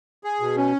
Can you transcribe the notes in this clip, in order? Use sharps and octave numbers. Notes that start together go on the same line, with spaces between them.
G#4
B2
C#4